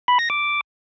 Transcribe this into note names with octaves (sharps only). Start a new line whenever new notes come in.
B5
A#6
D6